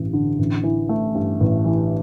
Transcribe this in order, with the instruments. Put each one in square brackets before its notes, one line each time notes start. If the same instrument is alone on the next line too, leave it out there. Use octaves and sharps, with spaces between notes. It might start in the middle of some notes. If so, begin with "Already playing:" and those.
Already playing: [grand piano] A1 G2
D3
A1
E3
A3
G2
A1
E3